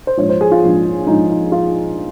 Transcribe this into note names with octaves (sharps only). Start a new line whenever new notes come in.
C5
A#1 G#2 F3 C#5
C5
G#4
F4
A#1 G#2 F3
A#1 G#2 F3 D#4
D#4
F4